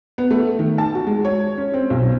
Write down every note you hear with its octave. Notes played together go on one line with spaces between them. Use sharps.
B3
A3
D#3
A5
F#4
G#3
C#5
C#4
C4
B1